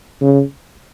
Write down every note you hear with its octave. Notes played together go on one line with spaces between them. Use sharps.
C#3